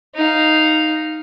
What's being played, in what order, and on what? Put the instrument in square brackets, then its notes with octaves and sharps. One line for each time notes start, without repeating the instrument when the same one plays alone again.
[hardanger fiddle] D#4 F5